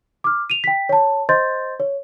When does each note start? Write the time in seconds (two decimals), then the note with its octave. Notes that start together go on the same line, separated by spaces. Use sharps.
0.24 D6 F6
0.50 D#7 F7
0.64 G5 B6
0.89 C#5 A5
1.29 C5 D#5 C6 G6 A6
1.80 C#5